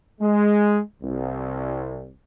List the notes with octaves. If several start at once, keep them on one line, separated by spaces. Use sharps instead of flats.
G#3
C2